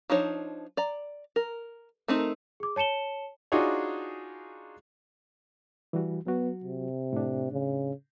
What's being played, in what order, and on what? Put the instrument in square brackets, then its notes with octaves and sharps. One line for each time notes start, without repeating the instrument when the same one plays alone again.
[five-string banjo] F3 D4 D#4 C5 C#5
D5 A#5
A#4
A3 C4 D#4 A#4
[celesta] G#4 D6
C#5 A5 C#7 E7 G7
[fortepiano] D4 D#4 F4 F#4 G#4 C#5
[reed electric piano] E3 G3 F#4
[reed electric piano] F#3 F#4 [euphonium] B3
[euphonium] C3
[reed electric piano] A2 D4
[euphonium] C#3